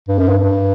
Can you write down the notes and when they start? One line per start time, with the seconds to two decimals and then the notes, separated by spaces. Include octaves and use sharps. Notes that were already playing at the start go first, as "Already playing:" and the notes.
0.09 G2
0.19 F#2
0.29 G2
0.39 G2